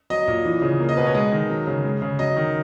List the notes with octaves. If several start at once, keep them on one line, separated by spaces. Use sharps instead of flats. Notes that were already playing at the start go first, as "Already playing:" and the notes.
F#3 D#5
A#2
E3
C#3
A#3
D#5
B2 B4
C#5
G#3 D#5
D#3
F#3
C#3
G#3
C#3
F#3 D#5
D#3